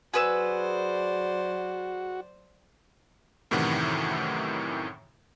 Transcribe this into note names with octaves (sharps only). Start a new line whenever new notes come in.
F#3 F#4 G#4 B4 C5 D5 E6
F#2 A2 C3 D#3 E3 F#5